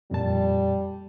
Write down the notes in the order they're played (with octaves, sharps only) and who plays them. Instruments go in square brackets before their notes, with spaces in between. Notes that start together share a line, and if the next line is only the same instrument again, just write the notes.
[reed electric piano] F2 A#2 A5 [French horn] G3